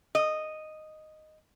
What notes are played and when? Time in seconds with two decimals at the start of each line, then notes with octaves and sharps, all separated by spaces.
0.15 D#5